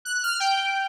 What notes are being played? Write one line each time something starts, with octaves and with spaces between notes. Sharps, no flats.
F#6
F6
G5